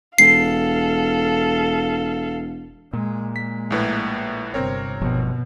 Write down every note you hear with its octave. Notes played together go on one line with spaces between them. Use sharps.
E1 A4 F5 C7
A#2 G#3
G#3 B6
A#1 A2 B4
G1 C3 C4 A#4 C#5
G1 B2 F3